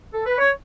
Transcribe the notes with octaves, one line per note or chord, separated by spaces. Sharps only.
A4
B4
C#5